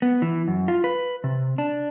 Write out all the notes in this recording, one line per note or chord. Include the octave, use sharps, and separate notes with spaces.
B3
E3
F#2
F4
B4
C3
D4